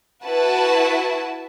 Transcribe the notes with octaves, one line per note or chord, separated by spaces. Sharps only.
E4 F#4 B4 A5